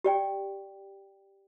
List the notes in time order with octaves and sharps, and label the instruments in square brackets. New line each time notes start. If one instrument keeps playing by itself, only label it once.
[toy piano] G4 D5 G5